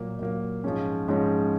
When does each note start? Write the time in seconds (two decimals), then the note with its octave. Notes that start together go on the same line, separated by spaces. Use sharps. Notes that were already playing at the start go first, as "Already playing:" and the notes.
Already playing: A#2 F#3 A#3
0.19 A#2 F#3 A#3
0.64 G#2 F3 G#3 C#4
1.08 G#2 F3 G#3 C#4